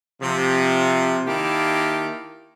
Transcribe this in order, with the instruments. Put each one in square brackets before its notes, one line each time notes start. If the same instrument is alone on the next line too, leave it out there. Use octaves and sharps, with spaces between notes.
[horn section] C3 F3
D#3 A#3 E4 G4 F5 A5